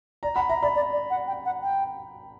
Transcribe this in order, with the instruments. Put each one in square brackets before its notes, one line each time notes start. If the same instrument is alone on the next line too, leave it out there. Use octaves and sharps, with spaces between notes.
[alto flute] D5 [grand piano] A#5
[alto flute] F#5 [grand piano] B5
[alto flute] E5 [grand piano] A#5
[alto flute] D5 [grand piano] B5
[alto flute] D5
D5
F#5
G5
F#5
G5